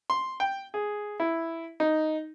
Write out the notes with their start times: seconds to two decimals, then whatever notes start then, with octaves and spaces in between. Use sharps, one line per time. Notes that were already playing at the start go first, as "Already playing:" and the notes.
0.10 C6
0.40 G5
0.74 G#4
1.20 E4
1.80 D#4